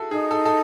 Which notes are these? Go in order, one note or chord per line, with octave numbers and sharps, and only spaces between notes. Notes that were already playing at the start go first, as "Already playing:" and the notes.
Already playing: E4 F#4 G#4 A4
D#4 G#4
A4
A4